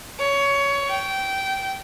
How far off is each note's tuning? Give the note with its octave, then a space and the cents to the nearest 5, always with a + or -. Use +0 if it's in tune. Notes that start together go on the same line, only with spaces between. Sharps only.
C#5 +15
G5 -20